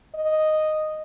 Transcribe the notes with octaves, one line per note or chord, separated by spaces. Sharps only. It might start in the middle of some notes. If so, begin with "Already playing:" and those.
D#5